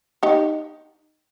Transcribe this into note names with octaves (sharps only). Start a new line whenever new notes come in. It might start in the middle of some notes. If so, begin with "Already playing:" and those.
D#4 G4